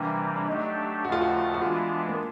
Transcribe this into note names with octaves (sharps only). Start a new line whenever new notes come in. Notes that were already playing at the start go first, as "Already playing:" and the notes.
Already playing: C3 E3 G3 A#3 D4
D4
F#3 A3 D4 D#4 G4
D#2 C#3 F3 A3 F#4
F4
F#4
F#4
E3 G#3 B3 D4 F4
A#3